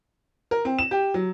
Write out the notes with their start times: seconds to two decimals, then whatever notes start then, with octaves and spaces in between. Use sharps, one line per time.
0.51 A#4
0.65 C4
0.79 E7
0.91 G4
1.14 F#3